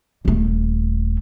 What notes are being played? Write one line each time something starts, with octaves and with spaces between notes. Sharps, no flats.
D#1 A3